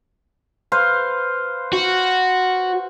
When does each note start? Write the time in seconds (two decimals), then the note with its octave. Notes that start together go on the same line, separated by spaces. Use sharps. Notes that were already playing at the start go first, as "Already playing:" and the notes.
0.72 B4 C5 F5
1.73 F#4